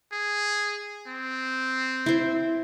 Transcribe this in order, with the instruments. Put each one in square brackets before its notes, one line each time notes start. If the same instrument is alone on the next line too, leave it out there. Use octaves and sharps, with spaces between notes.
[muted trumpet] G#4
C4
[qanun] E4 C5